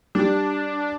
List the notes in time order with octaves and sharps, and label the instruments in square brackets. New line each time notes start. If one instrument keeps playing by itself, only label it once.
[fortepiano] G3 [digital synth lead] D4